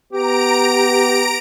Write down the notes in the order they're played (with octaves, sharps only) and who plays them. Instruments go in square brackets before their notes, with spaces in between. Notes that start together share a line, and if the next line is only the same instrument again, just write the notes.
[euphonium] B3 [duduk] G4 [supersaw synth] A#5 D7